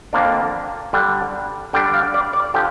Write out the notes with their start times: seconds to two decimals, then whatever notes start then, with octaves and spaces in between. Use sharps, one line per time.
0.13 F2 D3 F3 A#3 D4
0.93 D3 G3 D4
1.73 D3 G3 D4 G5
1.94 F5
2.14 D5
2.33 D5
2.54 D3 F3 G4